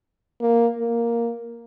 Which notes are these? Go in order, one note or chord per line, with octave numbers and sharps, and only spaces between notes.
A#3
A#3